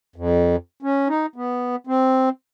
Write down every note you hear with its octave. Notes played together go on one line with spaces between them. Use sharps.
F2
C#4
D#4
B3
C4